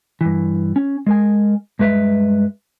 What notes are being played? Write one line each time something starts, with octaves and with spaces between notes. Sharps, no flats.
G2 E3
C#4
G#3 A#4 G#5
G2 G#3 B4 E5